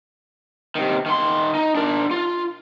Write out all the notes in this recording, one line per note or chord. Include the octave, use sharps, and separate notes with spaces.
C3 D#3
D#3 C6
D#4
D4 A#4
F4